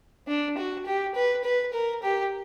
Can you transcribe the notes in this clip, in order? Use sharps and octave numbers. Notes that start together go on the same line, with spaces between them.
D4
F#4
G4
B4
B4
A#4
G4